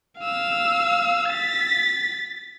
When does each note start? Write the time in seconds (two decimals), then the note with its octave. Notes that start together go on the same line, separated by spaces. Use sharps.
0.20 F5 E6
1.30 A6 B6